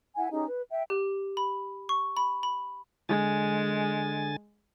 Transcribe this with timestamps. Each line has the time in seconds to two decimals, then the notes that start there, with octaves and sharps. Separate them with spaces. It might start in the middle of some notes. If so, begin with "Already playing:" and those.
0.16 E4 E5 F#5 G#5
0.32 C#4 D#4 G4 G#4
0.47 B4
0.70 E5 G5
0.90 G4
1.37 B5
1.89 C#6
2.17 B5
2.43 B5
3.09 D3 G#3 G#5 A6